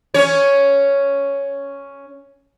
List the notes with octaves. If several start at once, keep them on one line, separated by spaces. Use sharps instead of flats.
C#4 C#5